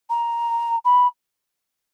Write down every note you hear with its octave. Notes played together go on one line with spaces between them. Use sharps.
A#5
B5